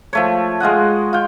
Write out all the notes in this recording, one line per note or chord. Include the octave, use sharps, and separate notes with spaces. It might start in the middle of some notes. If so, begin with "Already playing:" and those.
F3 A3 C#5
G#3 F4 D#5 F#5
F4 G5